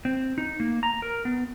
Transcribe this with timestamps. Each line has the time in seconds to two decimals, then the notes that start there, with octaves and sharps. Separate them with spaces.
0.05 C4
0.38 D#4
0.60 A#3
0.83 A#5
1.02 A#4
1.25 B3